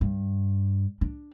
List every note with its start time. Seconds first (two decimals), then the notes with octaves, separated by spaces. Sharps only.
0.01 G2
1.01 D4